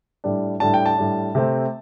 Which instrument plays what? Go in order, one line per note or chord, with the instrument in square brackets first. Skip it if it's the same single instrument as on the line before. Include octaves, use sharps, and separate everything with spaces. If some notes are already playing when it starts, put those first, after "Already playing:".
[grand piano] A2 G3 D4
A2 G3 D4 A5
G5
A5
A2 G3 D4
C3 A3 C4